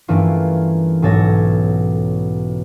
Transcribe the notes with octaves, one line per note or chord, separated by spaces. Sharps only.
G2 E3 A3 A#3 C#4 F4
B1 G#2 A4 C#5 A#6